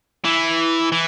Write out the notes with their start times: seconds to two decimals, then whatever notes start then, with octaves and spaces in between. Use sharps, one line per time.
0.25 E3
0.92 E3